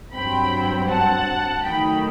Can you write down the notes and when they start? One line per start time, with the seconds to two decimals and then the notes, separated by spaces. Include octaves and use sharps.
0.13 G2 F#3 C4 G5 B5
0.88 F#5 A5
1.63 D#3 F#3 A3 D#4 G5 B5